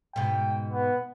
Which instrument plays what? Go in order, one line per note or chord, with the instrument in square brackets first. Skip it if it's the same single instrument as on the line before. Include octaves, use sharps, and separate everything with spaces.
[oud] G#2 B2 [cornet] G5
[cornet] B3